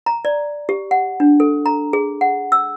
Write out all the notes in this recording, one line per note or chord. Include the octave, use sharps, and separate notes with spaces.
A#5
D5
G4
F#5
D4
A4
A#5
G#4
F#5
E6